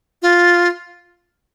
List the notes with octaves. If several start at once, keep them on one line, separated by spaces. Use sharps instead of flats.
F4